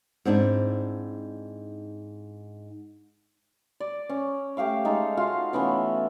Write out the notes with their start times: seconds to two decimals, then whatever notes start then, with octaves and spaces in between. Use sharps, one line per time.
0.25 G#2 C4 D4 E4
3.80 D5
4.09 C#4
4.57 A3 G4 F5 D6
4.85 G#3 D#4 A4
5.17 F4 F#4 F5
5.53 E3 A3 B3 C#4